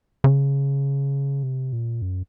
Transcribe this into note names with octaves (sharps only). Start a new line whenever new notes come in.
C#3
C3
A#2
F#2